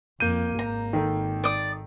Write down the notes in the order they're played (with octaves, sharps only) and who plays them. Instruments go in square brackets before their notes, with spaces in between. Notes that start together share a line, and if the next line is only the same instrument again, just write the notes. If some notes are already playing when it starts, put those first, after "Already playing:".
[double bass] F2 [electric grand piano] A#3 G6 D#7
[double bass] G#1 [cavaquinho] A#5
[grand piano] D#3 A4
[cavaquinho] D5 D#6